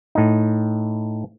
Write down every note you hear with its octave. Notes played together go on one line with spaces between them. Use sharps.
A2 D#4